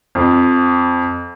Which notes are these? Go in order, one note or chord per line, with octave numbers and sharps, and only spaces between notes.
F2